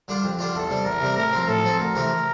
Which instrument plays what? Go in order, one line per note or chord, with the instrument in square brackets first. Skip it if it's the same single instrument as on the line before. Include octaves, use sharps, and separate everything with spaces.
[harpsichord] D3 G3 D4 F4
[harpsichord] F2 [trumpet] G4
[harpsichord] D3 G3 D4 F4
[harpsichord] E2 [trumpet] A4
[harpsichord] C3 G3
[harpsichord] E2 [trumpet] A#4
[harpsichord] C3 G3
[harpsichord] A2 [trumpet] A#4
[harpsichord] F3 C4
[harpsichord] A2 [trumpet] A4
[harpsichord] F3 C4
[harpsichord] D2 [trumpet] A#4
[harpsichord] C3 E3 A3 C4